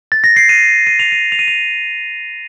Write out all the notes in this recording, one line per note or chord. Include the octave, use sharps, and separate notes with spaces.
A6
A#6
C7
D#7
D#7
F7
D#7
F7
D#7
F7